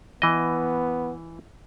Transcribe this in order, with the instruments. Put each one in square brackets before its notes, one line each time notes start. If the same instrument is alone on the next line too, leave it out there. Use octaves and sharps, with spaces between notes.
[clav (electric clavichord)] E3 D#5 [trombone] B3